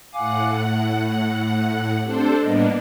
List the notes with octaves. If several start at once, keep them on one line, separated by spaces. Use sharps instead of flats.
A2 F5 F#5 G#5 D6
A3
A3 C4 D4 G4 A4 C5
A2 G3 A#3 B3 D4 D#5